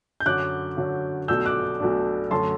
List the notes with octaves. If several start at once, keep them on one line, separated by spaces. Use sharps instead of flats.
G6
F#2 D3 F#3 D6 F#6
F#2 D3 F#3
B1 B2 A3 D4 E6 G6
D6 F#6
B1 B2 A3 D4
F#2 D3 A3 A5 C6